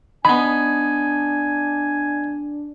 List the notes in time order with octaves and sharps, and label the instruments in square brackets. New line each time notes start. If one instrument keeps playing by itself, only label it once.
[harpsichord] B3 D#4 [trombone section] D4 [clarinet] G#5 [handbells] B5